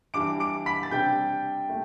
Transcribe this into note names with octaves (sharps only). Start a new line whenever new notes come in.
E3 G3 D4 D6 D7
D6 D7
B5 B6
A6
C3 G3 D4 G5 G6
A3